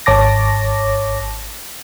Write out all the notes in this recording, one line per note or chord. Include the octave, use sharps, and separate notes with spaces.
G#1 C#5 A5 D6 A#6